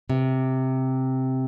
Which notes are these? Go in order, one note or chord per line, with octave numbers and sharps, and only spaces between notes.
C3